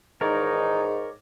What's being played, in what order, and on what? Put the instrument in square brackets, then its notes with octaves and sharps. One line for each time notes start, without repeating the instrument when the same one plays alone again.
[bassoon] G#2 [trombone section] D#3 E3 D#4 [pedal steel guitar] A#4 C#5 D5